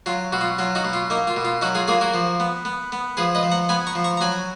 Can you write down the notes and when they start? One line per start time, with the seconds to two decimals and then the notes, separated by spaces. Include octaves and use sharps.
0.06 F#3 F4
0.32 B2 F#4
0.41 F4
0.58 F#3 F4
0.75 D#4 F#4
0.85 B2
0.93 F4
1.10 A#3 D#4
1.27 F4
1.36 B2
1.45 F4
1.62 F#3 D#4 F#4
1.75 F4 G#4
1.88 A#3 F4 G#4
2.01 F#4 A#4
2.14 F3
2.40 B3
2.65 B3
2.92 B3
3.17 F3 G#4 B4
3.35 B4 D#5
3.43 F3
3.52 F#5 A#5
3.69 B3 G#5 B5
3.87 A#5 C#6
3.95 F3
4.04 A#5 C#6
4.17 A#5
4.21 F#3 G#5 B5